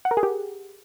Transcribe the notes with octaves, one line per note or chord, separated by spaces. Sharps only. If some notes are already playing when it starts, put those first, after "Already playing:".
F#5
A#4
G#4
G4